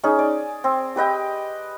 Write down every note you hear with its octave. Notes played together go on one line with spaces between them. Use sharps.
C#4 D#4 G#4
D5
C4
G4 B4 D#5 G5